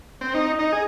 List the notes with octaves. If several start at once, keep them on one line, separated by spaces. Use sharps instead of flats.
C4
D#4
D#4
G#4